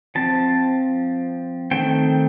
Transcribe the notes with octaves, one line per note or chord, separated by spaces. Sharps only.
F3 C4 A5
D#3 A3 C4 G5